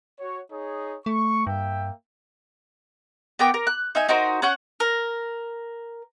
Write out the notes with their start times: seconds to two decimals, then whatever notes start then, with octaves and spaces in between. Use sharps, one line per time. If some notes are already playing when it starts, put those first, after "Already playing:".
0.19 F#4 C#5
0.52 D#4 G#4 C#5
1.06 A3 C#6
1.47 G2 A#3 E5 G5
3.39 B3 A#4 G5 D6
3.54 A#4
3.67 F#6
3.95 D#4 E5 G#5
4.08 D#4 F#4 A#4 C5
4.42 C#4 F#5 C#6 G6
4.80 A#4